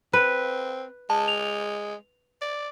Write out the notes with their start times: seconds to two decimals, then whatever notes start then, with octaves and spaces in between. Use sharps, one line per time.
0.13 C4 B4
1.10 G#3 A5
1.28 F7
2.41 D5